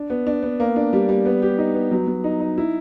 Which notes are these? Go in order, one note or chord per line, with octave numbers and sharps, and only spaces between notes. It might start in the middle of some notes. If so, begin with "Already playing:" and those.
Already playing: D4
B3
D4
B3
A#3
D4
G3
G3
B3
G4
D#4
B3
F#3
F#3
D#4
D#4
E4